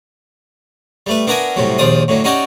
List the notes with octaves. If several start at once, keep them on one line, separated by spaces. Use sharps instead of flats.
G3 A3 B4
B3 D4 F#4 A#4 E5 G#5
C2 A2 C3 F#3
A#1 D#2 F3 D5 D#6
A2 D3 F#3
C#4 D#4 F#4 G4 C#5 D5